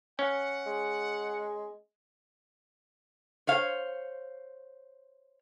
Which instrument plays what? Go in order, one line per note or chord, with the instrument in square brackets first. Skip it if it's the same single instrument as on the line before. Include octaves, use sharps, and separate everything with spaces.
[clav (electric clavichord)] C#4 [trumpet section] F#5
[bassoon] G#3
[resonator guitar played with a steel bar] C5 C#5 F5